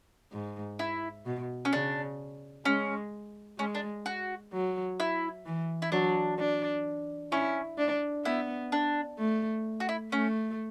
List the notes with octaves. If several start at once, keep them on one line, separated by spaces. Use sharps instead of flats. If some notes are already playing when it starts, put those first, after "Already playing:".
G#2
E4
B2
C#4
C#3 D4
G#3 C#4
G#3 C#4
D4
F#4
F#3
E4
E3
E4
F#3 D4
D4
C#4 E4
D4
B3 E4
D4
A3
F#4
E4
A3 C#4